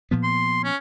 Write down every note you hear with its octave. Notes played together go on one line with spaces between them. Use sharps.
A#2 F3 B3
C6
C#4